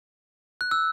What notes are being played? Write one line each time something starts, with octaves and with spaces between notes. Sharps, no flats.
F#6
E6